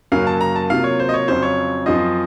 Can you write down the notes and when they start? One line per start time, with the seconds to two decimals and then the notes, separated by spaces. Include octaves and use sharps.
0.12 F#2 C#3 F#3 A#3 F5
0.27 A5
0.41 A#5
0.56 A5
0.70 C3 F#3 A#3 F4 F5
0.84 C#5
1.00 C5
1.09 D#5
1.14 C#5
1.28 F2 C#3 F#3 C4 C5
1.42 C#5
1.86 F#2 F3 C4 F4 D#5